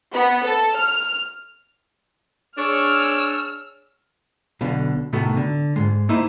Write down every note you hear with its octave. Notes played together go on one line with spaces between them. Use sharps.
B3
A4
F6
D4 G#4 C#5 E6 F6
B1 B2 D3 F5
A2 C3 D#3 B3 F#4 A4
D3
G#2 B2 G#3
A#3 D#4 E4 B4 C5